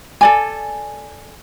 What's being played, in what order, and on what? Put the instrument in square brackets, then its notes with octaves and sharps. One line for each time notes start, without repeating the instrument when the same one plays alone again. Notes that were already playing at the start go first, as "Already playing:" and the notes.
[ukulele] A4 D5 G#5